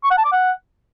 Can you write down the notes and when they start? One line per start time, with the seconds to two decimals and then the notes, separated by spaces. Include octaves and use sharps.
0.04 C#6
0.11 F#5
0.18 A5
0.25 D6
0.32 F#5